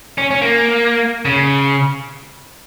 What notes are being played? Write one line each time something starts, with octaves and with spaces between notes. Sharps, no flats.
C#4
C#4
A#3
C#3